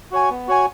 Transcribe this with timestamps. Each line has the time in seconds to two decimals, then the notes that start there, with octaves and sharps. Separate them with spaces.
0.11 F#4 C#5 G#5
0.30 B3
0.48 F#4 C#5 G#5